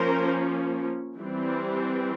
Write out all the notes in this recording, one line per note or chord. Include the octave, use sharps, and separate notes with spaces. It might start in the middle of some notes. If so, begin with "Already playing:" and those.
Already playing: F3 A#3 C#4 A#4 C5
E3 G3 C4